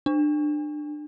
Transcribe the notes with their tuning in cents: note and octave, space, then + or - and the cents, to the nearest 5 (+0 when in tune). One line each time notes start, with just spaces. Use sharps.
D4 +25